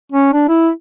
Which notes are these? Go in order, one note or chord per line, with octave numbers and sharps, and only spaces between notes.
C#4
D4
E4